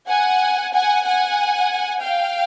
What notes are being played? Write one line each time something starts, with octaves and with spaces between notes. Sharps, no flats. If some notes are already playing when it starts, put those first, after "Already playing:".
F#5 G#5
F#5 G#5
F#5 G#5
F5 G5